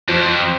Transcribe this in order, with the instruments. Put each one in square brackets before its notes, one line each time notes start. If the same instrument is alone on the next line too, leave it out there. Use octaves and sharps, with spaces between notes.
[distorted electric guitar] F2 [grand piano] F3